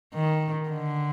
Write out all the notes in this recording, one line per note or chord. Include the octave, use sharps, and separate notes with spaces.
D#3
D3